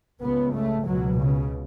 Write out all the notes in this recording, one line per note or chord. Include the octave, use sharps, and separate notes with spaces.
C#2 C#3 B3
A3
C#2 B2 F#3
C#3